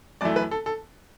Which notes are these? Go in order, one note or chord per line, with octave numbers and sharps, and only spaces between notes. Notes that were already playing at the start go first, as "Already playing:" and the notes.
F#2 E3 A3 D5
B4
A4
A4